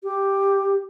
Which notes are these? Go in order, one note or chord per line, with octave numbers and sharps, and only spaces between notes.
G4